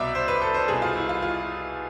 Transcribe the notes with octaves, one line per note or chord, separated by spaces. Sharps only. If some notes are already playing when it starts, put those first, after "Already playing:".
Already playing: C2 B2 D5 E5
C5
B4
A4
C5
C2 B2 G#4
F4
E4
F4
F4